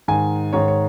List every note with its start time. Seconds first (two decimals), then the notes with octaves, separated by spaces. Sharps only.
0.08 G#2 D#3 G#5
0.53 G#2 D#3 C#5
0.68 C#5